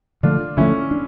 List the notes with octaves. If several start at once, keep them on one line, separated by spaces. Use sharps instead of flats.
D3 F3 A3 D4 F4
D3 F3 A3 C#4 E4
D4